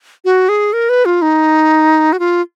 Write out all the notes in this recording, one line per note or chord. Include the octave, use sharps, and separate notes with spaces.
F#4
G#4
A#4
B4
F4
D#4
F#4
F4